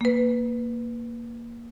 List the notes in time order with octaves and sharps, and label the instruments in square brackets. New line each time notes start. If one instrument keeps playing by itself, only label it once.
[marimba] A#3 B4